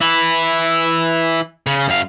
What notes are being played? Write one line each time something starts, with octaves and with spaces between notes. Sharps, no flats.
E3 E4
C#3
F#2 F5